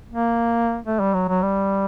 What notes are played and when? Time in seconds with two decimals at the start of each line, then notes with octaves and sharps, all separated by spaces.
0.11 A#3
0.86 A3
1.00 G3
1.14 F#3
1.28 F#3
1.43 G3